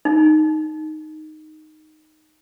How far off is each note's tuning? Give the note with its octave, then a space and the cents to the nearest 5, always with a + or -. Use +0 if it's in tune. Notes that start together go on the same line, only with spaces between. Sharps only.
D#4 -5